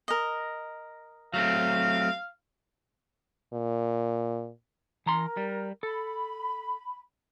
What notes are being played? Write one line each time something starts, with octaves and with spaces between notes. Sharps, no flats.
A#4 D#5
F#3 A3 C4 F5
A#2
E3 A#4 A#5 C6
G3
A4 B5